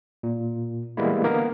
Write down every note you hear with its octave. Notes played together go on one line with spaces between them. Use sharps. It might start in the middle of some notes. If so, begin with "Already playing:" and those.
A#2
E3 G3 G#3 A#3 B3 E4
D3 A#3 B3 A#4